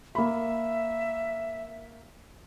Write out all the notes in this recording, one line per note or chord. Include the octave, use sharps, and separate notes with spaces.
A#3 E5 B5